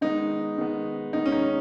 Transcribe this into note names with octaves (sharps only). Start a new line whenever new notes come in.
D#3 G#3 B3 D#4
D#3 G#3 B3
D#3 G#3 B3 D#4
C#4
D#4